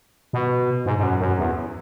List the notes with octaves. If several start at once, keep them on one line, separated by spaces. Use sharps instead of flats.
B2
G#2
G#2
F#2
F#2
E2